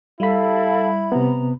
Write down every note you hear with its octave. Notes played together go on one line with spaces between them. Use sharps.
G3 E4 A4 F5 B5
C3 B3 A#5